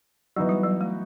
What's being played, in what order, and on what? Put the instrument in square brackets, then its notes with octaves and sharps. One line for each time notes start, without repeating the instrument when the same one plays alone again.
[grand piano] E3 B3 D#4 F#4 [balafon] F#3
[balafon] G3
F#3
A3